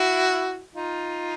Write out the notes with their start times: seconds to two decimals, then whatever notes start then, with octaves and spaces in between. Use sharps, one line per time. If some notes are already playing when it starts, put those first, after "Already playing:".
Already playing: E4 F#4
0.74 D#4 F4